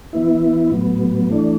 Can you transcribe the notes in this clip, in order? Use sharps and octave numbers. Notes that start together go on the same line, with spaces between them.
E3 B3 E4
A2 F#3 B3
E3 A3 D4